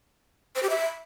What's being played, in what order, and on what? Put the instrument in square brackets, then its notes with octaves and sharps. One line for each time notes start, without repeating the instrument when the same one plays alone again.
[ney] C5
G4
E5